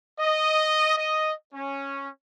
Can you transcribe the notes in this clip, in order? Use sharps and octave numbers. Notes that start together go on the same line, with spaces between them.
D#5
D#5
C#4